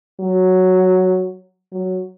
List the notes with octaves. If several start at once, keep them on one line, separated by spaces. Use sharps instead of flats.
F#3
F#3